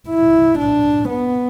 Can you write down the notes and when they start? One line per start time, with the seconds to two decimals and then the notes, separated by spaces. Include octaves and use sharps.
0.09 E4
0.58 D4
1.09 B3